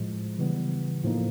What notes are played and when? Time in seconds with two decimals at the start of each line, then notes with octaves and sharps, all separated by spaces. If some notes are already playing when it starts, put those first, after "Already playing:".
Already playing: A2 F3 G#3
0.38 C#3 E3 G3 B3
1.04 A2 F3 A#3 D#4